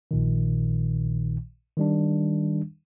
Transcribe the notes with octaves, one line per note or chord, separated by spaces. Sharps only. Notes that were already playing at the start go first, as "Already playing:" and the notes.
A#1 A#2 D#3
D#3 G3 D4